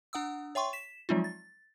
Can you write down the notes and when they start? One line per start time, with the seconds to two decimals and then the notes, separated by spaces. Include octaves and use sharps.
0.13 D4 F#5 D#6 E6
0.55 C#5 E5 G5 C6 C#6
0.73 B6 E7
1.09 F3 F#3 G#3 C4 D#4 F4
1.24 A6